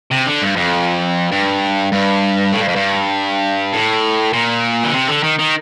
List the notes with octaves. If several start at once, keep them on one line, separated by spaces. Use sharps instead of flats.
C3
D3
G2
F2
G2
G2
A2
G2
F2
G2
A2
A#2
D3
C3
D3
D#3
D#3